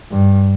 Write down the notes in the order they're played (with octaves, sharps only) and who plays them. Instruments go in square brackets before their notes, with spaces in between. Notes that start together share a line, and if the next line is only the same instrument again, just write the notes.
[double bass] G2